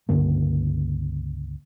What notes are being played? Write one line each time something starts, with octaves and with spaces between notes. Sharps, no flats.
C#2 G2 D3 A#3